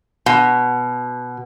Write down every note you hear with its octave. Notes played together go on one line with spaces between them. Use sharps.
B2